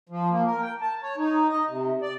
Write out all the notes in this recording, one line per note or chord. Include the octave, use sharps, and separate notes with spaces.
F3
A#3
A#4
G5
A5
C#5
D#4
D#5
C3
D5